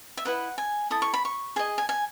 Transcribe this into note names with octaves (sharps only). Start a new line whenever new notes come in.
E5
E4 B4 D#5 F#5
G#5
E4 A4 D#6
C#6
B5
C#6
G#4 D#5 G#5
G#5
G#5